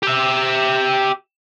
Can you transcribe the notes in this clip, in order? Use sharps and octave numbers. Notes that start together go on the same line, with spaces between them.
G4 E5